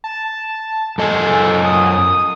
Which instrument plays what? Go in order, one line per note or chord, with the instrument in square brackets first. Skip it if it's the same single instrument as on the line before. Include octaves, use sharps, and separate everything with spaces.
[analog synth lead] A5
[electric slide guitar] F#2 D#5 G#5 [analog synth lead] A4
[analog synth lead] D#6